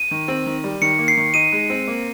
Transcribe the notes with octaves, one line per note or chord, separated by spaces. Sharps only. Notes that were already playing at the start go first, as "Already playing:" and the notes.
Already playing: D#7
D#3
C4
D#3
G3
D#3 C#7
A#3
C7
D#3
D#4 D#7
G#3
C4
A#3